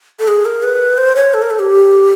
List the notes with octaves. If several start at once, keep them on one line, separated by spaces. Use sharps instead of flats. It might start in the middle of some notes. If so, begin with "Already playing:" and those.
A4
G#4
A#4
B4
C5
C#5
A4
A#4
A4
G4